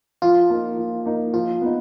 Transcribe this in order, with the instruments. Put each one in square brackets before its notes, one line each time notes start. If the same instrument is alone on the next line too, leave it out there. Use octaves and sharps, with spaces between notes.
[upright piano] F3 [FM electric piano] F4
[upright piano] A#3 D#4
F3
A#3 D#4
[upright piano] F3 [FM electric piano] F4
[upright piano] B3 D#4